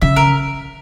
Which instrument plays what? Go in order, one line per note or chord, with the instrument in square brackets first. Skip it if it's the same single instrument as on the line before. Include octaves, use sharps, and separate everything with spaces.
[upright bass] C#3 [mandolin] E5
[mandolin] A#4